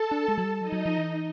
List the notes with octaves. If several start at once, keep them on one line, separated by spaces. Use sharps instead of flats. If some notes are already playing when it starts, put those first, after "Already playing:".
Already playing: A4 A5
D4
G#3
F#3
G3
F#3 D#4 D#5
F#3
F3
E3